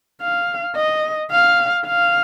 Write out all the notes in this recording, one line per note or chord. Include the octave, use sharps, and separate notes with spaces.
F5
D#5
F5
F5